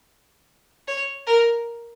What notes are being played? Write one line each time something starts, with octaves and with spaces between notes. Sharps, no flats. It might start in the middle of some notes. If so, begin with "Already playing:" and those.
C#5
A#4